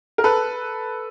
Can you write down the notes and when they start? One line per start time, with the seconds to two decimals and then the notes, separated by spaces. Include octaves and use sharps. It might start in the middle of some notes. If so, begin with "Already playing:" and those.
0.18 A#4
0.24 A4 B4